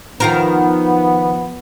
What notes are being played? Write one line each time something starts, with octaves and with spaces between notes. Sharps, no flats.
D#3 F3 B3 F4 A#4